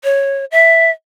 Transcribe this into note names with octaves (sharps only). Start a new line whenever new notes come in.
C#5
E5